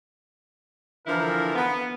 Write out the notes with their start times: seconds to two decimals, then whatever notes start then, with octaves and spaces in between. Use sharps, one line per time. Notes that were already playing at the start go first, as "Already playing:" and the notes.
1.06 D3 E3 F3 E4 A#4
1.56 B3